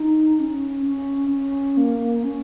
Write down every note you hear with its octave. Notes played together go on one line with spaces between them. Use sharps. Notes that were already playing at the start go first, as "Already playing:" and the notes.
Already playing: D#4
C#4
C#4
C#4
A#3
C#4